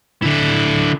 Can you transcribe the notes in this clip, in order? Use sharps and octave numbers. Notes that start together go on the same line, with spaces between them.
D3 E4